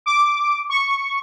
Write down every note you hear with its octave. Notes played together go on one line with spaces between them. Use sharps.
D6
C#6